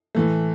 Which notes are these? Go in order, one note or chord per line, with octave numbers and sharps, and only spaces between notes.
A2 E3 A3